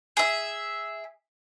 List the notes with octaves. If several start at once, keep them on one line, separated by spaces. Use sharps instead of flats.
G#4 E5